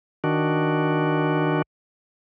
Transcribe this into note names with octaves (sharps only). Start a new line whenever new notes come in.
D#3 D4 F#4